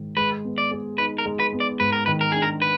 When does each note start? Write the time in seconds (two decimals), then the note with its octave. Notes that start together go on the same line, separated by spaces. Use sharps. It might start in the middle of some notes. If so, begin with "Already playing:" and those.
Already playing: G#2 D#3
0.17 G#3 B4
0.44 B3
0.58 D5
0.71 G#4
0.98 D#4 B4
1.18 A#4
1.26 G#3
1.40 B4
1.53 B3
1.60 D5
1.80 G#2 B4
1.92 A#4
2.06 D#3 B4
2.21 A#4
2.32 D4 G#4
2.42 A#4
2.62 B4